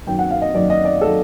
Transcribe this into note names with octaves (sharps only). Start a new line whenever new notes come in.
F#2 D#3 F#3 G5
F#5
F5
D#5
F#2 D#3 F#3 D5
D#5
D5
D#3 F#3 A4